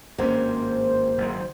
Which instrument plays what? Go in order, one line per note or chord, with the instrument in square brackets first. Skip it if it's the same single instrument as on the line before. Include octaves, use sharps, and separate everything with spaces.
[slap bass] G#1 G2 C#4 [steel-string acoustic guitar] A#3 [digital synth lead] C5
[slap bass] F#1 G#2 D#3